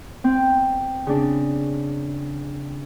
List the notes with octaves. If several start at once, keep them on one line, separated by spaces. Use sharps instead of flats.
C4
C#3 D4